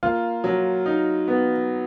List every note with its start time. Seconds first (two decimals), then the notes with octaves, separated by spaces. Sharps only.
0.03 A#3 F4
0.44 F#3
0.86 D#4
1.28 B3